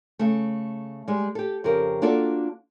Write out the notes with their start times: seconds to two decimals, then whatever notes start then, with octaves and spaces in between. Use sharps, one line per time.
0.19 C#3 A3
1.08 G3 G#3
1.35 G4 A4
1.64 F2 C#3 G4 A#4
2.02 A#3 D4 F4 F#4 A4 D5